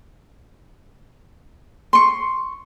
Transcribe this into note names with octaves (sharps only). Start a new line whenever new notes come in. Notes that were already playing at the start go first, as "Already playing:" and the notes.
C6 C#6